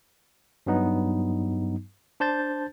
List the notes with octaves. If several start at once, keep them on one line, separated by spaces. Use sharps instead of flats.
G2 F#3 B3 D#4
D4 C5 A5 G6 A6